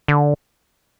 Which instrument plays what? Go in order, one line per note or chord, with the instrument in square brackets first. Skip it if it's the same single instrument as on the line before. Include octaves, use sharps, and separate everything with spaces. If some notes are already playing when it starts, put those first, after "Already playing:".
[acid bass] D3